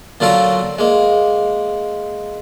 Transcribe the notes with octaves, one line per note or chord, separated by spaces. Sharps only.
A#2 D3 F#3 F4 A4 A#4
G#3 A#3